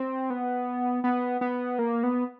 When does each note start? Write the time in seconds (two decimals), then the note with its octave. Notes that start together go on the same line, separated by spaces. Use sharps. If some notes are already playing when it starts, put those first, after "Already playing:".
Already playing: C4
0.30 B3
1.04 B3
1.41 B3
1.79 A#3
2.03 B3